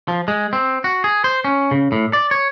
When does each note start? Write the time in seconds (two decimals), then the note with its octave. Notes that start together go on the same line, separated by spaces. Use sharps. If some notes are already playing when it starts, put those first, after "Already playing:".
0.08 F3
0.28 G#3
0.53 C4
0.84 F#4
1.04 G#4
1.24 C5
1.45 C#4
1.71 C#3
1.92 A2
2.13 D5
2.31 C#5